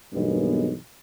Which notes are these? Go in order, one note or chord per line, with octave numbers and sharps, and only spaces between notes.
B1 E2 G2 G#3 A#3 B3